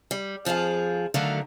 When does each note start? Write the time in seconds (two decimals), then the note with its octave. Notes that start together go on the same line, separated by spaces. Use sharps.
0.11 G3
0.45 F2 F3 D4 F4 G#4
1.14 D3 D#3 F#3 A3 F#4 F5